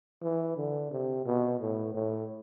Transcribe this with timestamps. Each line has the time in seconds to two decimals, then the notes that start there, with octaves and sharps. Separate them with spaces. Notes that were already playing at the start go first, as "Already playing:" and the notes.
0.23 E3
0.57 D3
0.91 C3
1.26 B2
1.60 A2
1.94 A2